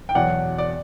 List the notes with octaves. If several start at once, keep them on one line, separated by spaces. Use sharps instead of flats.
G5
E2 B2 F#3 D5 F#5
D5